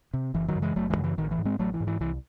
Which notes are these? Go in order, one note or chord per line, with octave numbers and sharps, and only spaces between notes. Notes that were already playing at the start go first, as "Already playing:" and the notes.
C3
F#1 E3
D#3 F#3
F#2 C#3
E3 G#3
F#1 F#3 A3
E3 G#3
F#2 C#3
E3
A1 D#3
E3
G#2
G#3 C4
A1 F#3 A3
E3
G#2
E3
C2 E3